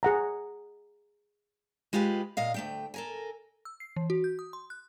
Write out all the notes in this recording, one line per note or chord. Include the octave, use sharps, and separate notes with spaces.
G#4 F#5 A#5
G#3 F4 G4 B4 G#5
A#2 D#5 F5
D2 A3 G5
A4 A#4 G#5
E6
C7
E3
F#4
G6
D#6
C6
F#6